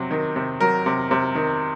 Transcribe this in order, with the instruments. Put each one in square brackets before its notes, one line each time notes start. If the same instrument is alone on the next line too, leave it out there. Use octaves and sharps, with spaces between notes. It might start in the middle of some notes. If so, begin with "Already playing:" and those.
Already playing: [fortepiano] C3 F#3
D#3
C3
F#3 A#4
C3
C3
D#3